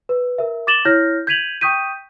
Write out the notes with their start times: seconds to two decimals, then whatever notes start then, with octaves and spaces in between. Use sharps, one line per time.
0.09 B4
0.38 A#4 E5
0.67 D6 A6 E7 F#7 G7
0.85 E4 C#5 F6 G6 A#6
1.27 G6 G#6 B6 D#7 F7 F#7
1.61 G5 C#6 D#6 G6 B6 D#7